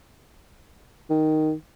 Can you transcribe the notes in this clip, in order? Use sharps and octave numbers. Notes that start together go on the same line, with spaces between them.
D#3